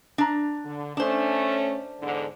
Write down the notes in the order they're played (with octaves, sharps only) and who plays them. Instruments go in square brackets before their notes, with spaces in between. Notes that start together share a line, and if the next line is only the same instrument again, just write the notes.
[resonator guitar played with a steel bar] D4 A#5
[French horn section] D3
[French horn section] A3 C#4 [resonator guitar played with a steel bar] D4 C5
[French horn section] E2 G#2 D3